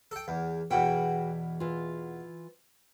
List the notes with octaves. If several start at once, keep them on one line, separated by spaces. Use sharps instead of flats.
A4 G5
E2
E2 B2 F#4 F#5 G5
E3 F4